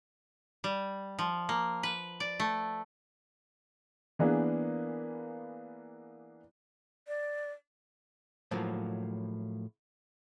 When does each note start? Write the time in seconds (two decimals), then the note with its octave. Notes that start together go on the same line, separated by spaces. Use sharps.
0.64 G3
1.19 F3
1.49 A#3
1.83 B4
2.20 D5
2.40 A3
4.19 E3 A#3 B3 D4 G#4
7.08 D5
8.51 A2 F3 F#3 A#3